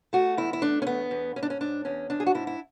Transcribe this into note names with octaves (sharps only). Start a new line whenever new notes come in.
A3 F#4
E2 E4
E4
A3 D4
C#4
E2 B3
E2
G#2 C#4
D4
C#4
G#2 D4
E2 C#4
E2 D4
G#4
F#4
G#2 E4
E4